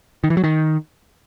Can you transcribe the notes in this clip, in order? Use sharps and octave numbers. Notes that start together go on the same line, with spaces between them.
D#3
E3
F#3
D#3